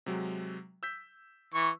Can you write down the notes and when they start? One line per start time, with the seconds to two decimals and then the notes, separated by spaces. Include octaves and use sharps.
0.06 C3 F#3 G#3
0.83 E6 G6 B6
1.54 E3 C#6